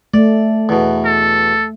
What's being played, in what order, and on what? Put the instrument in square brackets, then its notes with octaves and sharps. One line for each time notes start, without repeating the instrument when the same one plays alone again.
[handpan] A3 [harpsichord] D5
[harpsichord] E2 B2
[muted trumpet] A4